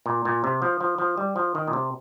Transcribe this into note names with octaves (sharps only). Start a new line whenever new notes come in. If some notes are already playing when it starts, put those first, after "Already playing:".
A#2
A#2
C3
F3
F3
F3
G3
F3
D#3
A#2
C3